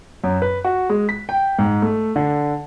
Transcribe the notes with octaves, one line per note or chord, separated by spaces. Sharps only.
F#2
B4
F#4
G#3
B6
G5
G#2
A3
D3